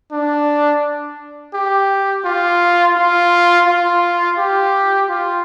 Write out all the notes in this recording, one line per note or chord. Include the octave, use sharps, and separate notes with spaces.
D4
G4
F4
F4
F4
G4
F4